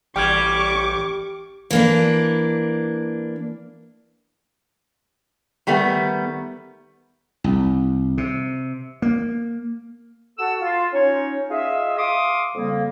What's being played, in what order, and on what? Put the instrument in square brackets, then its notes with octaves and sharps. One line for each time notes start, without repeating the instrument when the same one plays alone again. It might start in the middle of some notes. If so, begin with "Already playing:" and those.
[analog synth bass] A1 [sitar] G3 [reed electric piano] G5 F6 G#6 [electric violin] C#6 D6
[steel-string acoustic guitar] E3 A#3 D4
[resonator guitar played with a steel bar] D#3 G3 A3 B3
[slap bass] C2
C3
A#3
[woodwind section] F#4 A4 F#5 A5 C#6 E6
F4
C#4 D#4 C#5
F4 G#4 D#5 E5
F5 C6 D6 D#6
F2 C#3 G3 A#3